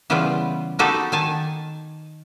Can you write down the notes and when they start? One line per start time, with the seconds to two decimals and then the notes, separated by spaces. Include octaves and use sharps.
0.10 C#3 E3 G3 B3 F4 B4
0.79 A#3 B3 D#4 F#4 G4 A4
1.12 D#3 G#5 A5